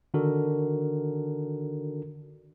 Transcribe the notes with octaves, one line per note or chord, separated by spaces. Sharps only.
D3 D#3 D4 F#4 A4 A#4